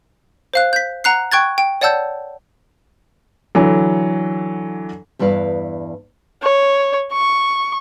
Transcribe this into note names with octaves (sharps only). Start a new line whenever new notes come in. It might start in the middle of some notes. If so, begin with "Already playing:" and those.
C5 F5 F#6
G6 B6
F#5 A#5 F#6 C7
G5 C#6 F#6 G#6 A6
G5
C#5 D5 F#5 A5 E6 G6
D3 E3 F#3
E2 G2 E4 B4 F5
C#5
C#6